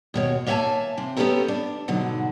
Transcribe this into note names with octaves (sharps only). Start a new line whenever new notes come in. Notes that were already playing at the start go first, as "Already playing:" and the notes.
D#2 B2 C#5
A#3 C#5 E5 F#5 G#5 A5
C3 C4
B3 C#4 F4 G4 A4 A#4
D4
G#2 B2 D3 F#3